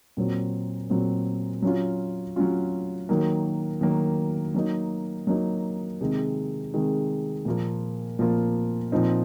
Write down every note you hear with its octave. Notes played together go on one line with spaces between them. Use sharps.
A#2 F#3 C4
A#2 F#3 C4
F#3 C#4 F4
F#3 C#4 F4
D#3 F#3 A#3
D#3 F#3 A#3
F#3 A#3 D#4
F#3 A#3 D#4
C3 D#3 G#3
C3 D#3 G#3
A#2 F3 A#3 F4
A#2 F3 A#3 F4
A#2 F3 C4 D#4